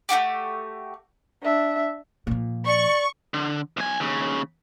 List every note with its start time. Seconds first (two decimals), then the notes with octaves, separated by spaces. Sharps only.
0.09 A3 D#4 F#4 G4
1.43 D4 E5
2.27 A#2 F3
2.65 D5 C#6
3.34 D3
3.77 B1 G#5
4.00 D#2 C#3